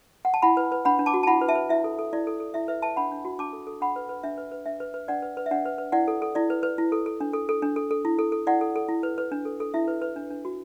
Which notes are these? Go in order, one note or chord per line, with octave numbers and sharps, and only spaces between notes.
F#5
A5
E4 F#5 B5
B4
B4
D4 F#5 B5
D4
A5 D6
F#4
A5
E4 F#5 B5
B4
E5 A5
B4
E4 E5
A4
A4
E4 D5
A4
A4
E4 E5
B4 E5
B4 E5 A5
D4 F#5 B5
D4
F#4
D4 A5 D6
A4
A4
D4 F#5 B5
B4
B4
D4 E5
B4
B4
D4 E5
B4
B4
D4 D5 F#5
B4
B4
E5
D4 D5 F#5
B4
B4
E4 D5 F#5
A4
A4
E4 D5
B4
B4
E4
A4
A4
D4
A4
A4
D4
A4
A4
E4
A4
A4
E4 D5 F#5
A4
A4
E4
B4
B4
D4
A4
A4
E4 E5
B4
B4
D4
D4
F#4